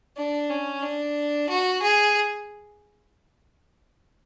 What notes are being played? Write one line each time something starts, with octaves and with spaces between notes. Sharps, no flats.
D4
C#4
D4
F#4
G#4